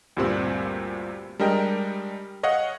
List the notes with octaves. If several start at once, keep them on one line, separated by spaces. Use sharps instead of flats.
D2 G2 A#2 G3 C4
G3 G#3 D4 A#4 D#5 G5
C#5 D#5 F5 F#5